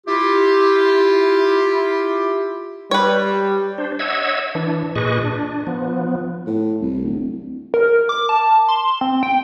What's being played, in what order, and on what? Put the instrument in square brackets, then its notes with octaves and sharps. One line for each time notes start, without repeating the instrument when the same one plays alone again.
[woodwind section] E4 F4 G4
[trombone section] G3 [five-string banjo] B4 C#5
[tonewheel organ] D4 C5
C#5 D#5 E5 F#5 E6 G#6
E3 D4
A#2 G#4 B4 D#5 C#6
D4
F3 B3
[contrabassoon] A2
C2
D1
[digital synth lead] A#4
D6
A5
C6
C4
G5